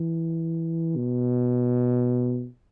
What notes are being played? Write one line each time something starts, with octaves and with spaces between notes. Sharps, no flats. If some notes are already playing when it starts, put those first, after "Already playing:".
Already playing: E3
B2